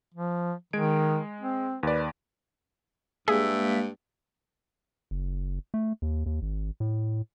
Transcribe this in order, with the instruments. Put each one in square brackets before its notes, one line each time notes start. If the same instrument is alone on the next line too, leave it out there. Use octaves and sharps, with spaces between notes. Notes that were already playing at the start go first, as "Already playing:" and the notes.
[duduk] F3
[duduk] D#3 [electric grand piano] G#3 G#6 D7
[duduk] C4
[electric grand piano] D#2 D5 [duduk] B4
[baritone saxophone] G2 [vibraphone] G#3 A#3 F5 [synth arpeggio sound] G#4 [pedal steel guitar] E5
[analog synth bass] F#1
A3
D#2
D#2
G#1
A2